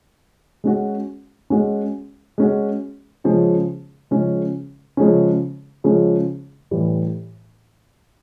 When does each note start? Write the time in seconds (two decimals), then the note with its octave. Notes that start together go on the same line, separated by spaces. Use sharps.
0.64 G#3 C#4 F#4
1.50 G#3 C#4 F#4
2.38 G#3 C#4 F#4
3.24 C#3 F3 G#3 C#4
4.11 C#3 F3 G#3 C#4
4.97 C#3 F3 G#3 C#4
5.84 C#3 F3 G#3 C#4
6.71 A2 E3 G3